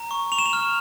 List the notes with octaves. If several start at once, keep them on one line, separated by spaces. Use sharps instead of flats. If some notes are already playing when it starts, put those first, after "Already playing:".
Already playing: A#5
C#6
C#6 F7
E7
F7
F6